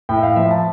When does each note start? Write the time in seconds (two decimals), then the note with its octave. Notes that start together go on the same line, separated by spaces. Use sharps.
0.09 A2 G5
0.18 E5
0.23 F5
0.36 F3 E5
0.51 A5